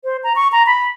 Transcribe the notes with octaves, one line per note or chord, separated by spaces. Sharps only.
C5
A#5
C#6
A#5
B5